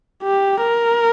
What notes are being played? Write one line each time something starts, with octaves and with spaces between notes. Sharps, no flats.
G4
A#4